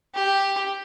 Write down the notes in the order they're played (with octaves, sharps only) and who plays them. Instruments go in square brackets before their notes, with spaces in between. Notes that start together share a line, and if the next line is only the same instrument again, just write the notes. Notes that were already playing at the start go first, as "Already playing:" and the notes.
[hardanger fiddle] G4